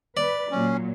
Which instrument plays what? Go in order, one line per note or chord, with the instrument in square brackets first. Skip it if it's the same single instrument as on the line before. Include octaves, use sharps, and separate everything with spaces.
[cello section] B4 [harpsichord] D5
[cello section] A#2 F#3 [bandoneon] C#4